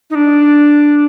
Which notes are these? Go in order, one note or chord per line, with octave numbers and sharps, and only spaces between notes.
D#4
D4